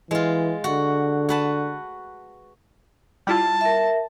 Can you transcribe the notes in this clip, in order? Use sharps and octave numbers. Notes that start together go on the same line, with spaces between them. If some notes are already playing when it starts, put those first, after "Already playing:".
E3 G#3 F4
D3 F#4
F#4 B4 A5
G3 E4 F4 A5
A#4 E5